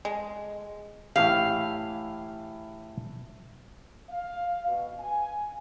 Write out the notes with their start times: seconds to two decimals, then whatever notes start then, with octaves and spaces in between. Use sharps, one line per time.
0.05 G#3
1.16 A2 E3 G4 F5
4.10 F5
4.67 B2
4.99 G#5